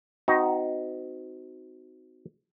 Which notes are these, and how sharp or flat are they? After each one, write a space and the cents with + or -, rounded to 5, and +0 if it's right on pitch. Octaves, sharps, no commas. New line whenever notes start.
C4 -30 D#4 +5 F#4 +0